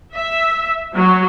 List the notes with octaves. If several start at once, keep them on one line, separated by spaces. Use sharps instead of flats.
E5
F#3